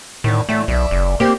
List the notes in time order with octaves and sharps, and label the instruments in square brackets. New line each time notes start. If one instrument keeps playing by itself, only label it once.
[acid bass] A2 [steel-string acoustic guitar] D3 D#3
[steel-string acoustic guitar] A2 D3 E3 [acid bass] A3
[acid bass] B1 [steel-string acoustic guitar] D5 E5
[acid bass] F#1
[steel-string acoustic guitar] A#3 C4 [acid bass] G4